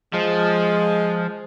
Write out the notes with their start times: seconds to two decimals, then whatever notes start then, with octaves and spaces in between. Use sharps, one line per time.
0.13 F3 G#3